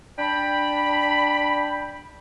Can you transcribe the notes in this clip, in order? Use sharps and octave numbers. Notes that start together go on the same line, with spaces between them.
D4 G5 B5